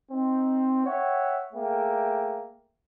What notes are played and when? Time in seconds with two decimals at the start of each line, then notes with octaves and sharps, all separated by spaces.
0.12 C4 D#4
0.86 C#5 E5 F#5 G5
1.53 A3 A#3 G#4 E5 G5